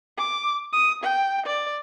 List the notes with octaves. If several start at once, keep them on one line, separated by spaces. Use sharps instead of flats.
D6
D#6
G5
D5